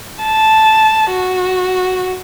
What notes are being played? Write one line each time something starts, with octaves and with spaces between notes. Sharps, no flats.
A5
F#4